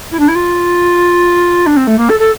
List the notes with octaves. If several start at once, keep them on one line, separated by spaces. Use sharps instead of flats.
E4
D4
E4
F4
D4
C4
A3
A#3
A4
A4